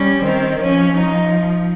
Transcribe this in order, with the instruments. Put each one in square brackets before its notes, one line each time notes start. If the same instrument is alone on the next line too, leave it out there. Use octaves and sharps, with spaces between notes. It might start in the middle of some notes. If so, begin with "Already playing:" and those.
Already playing: [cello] G3 [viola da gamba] C#4
[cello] D#3 [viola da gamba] C4
[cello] F3 [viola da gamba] C#4
[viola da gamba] D#4